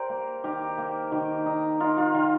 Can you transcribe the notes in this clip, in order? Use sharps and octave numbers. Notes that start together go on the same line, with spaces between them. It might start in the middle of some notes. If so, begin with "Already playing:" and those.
Already playing: G4 A#4 C5 D5
A#3
D#3 G4 A#4
A#3
D#3 G4
D#4
D#4 F4
F4
D#3 F4